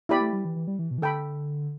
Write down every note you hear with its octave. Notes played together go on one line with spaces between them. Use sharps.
B3 E4 G4 D5 B5
A3
G3
E3
E3
G3
E3
B2
E3
D3 A4 G5 B5